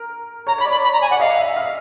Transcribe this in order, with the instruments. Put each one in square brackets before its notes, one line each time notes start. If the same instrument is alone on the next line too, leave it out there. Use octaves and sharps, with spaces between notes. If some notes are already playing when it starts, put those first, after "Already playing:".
Already playing: [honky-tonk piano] A#4
[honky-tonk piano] C#5 [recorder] A#5
[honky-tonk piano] C#5 [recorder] B5
[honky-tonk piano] D5
[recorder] B5
B5
A#5
G#5
[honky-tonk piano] D5 [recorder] F#5
[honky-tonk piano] D#5 [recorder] F5
[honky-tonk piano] E5
F5